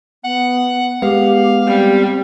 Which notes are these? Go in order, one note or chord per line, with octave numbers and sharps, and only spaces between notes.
B3 F#5
G#3 B3 G4 F5
G3 C4